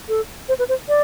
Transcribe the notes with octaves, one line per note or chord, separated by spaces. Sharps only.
A4
C5
B4
C5
D5